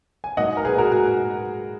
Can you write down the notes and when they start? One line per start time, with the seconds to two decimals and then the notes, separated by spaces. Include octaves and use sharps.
0.24 G#5
0.37 G#2 F#3 A#3 D#5 F#5
0.57 A#4
0.65 G#4 B4
0.78 F#4 A#4
0.92 F#4